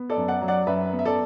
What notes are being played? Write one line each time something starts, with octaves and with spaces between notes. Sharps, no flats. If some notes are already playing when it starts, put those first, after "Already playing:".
Already playing: B3
A4 D5
F#2
D5 F#5
F#3
D5 F#5
F#2 B4 E5
B3
E5
A4 D5